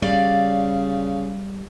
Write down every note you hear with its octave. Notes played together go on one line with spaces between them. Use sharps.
C#3 G3 D5 F5